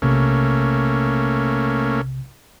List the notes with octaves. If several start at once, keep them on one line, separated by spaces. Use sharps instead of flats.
B1 C3 A3 A#3 C#4